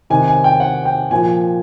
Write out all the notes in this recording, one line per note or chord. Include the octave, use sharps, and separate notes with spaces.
C3 D#3 G#5
G#5
G5
F#5
G5
A#2 F3 G#5